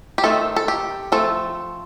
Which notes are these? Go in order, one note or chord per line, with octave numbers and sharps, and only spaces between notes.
G4
D#3 A3 C4 A4
A4
G4
F3 A3 C4 A4